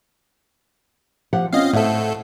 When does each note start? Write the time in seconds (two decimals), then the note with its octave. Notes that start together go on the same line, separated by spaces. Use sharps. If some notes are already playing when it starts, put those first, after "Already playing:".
1.33 F3 G4 F#5
1.53 C4 C#4 F4 D#5 F5
1.73 A2 A4 C5 E5 F#5